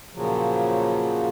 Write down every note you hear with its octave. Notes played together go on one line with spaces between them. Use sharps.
A#2 C#3 F3 F#3